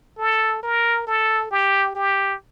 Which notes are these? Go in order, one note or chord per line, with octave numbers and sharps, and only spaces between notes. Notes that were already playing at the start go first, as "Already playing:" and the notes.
A4
A#4
A4
G4
G4